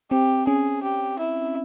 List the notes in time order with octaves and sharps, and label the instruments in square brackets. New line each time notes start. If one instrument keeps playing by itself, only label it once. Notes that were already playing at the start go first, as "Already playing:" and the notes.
[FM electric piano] C4 [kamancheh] G4
[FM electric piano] C#4 [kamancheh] G#4
[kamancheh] G4
E4